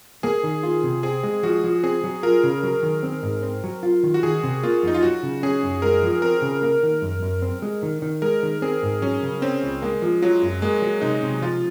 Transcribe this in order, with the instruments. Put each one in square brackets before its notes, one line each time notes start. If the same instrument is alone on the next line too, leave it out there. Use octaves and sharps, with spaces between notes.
[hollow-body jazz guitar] A#3 [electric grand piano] G#4
[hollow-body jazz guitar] D#3
F4
C3
[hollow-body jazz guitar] C4 [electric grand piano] G#4
[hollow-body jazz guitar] G#3
[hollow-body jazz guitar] F3 [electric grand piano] F#4
[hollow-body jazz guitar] F3
[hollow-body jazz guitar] C4 [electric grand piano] G#4
[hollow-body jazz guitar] F#3
[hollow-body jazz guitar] F4 [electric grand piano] A#4
[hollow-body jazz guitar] C#3
F#3
D#3
C4
G#2
C4
F#3
F4
D#3
[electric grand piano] F#4
[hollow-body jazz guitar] D#3 [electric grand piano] G#4
[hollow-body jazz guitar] C3
[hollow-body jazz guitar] A#3 [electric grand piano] F4
[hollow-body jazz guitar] F2 [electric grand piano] D#4
[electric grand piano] F4
[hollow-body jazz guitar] F#3 [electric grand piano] F#4
[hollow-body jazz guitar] C#3
[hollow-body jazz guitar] C#4 [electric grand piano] G#4
[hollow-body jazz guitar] F#2
[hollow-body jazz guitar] G#3 [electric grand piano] A#4
[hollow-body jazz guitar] F3
[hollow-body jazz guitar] C4 [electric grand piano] A#4
[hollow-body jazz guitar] C#3
A#3
D#3
F#2
F#2
C4
G#3
D#3
D#3
[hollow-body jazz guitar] G#3 [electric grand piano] A#4
[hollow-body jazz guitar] D#3
[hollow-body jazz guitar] C4 [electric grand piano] G#4
[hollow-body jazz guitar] G#2
[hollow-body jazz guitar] F#3 [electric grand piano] C#4
[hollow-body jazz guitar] C#3
[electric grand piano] C4 [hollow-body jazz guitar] C#4
[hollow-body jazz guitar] C#2
[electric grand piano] G#3 [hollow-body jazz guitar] A#3
[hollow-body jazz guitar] F3
[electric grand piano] F#3 [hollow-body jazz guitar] F4
[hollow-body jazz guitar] F#2
[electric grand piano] G#3 [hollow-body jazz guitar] A#3
[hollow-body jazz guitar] F#3
[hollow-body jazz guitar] C3 [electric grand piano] D#4
[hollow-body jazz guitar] C3
[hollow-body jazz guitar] F3 [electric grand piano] F4